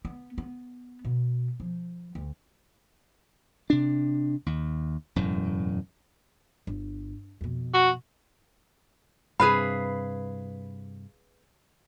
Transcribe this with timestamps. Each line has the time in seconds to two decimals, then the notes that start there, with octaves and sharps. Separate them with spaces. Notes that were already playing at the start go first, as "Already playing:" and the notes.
0.05 B3
0.38 B3
1.05 B2
1.60 F3
2.15 D2
3.70 C3 D4
4.46 D#2
5.16 E1 F#2 A2
6.67 G1
7.41 F2 B2
7.74 F#4
9.40 G2 C3 G#4 B4 F5 B5